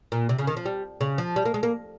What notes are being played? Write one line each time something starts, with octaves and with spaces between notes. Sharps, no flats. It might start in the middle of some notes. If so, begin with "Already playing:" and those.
A#2
C3
C#3
D#3
F3
G3
C#3
F3
G3
A#3
G#3
A#3